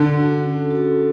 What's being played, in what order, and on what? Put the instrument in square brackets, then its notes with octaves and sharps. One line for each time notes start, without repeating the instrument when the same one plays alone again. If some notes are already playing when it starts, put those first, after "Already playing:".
Already playing: [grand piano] D3
[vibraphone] F#4 A4
C#4
F#4 A4